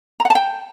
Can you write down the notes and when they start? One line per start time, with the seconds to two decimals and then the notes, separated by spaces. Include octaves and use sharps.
0.20 A#5
0.25 F#5
0.30 A5
0.35 G5